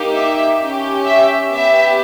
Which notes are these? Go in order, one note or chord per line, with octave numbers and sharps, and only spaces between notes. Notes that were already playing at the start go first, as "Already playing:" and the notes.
Already playing: A#3 D#4 G4
E5
C#4 G4
E5
B3 G4 E5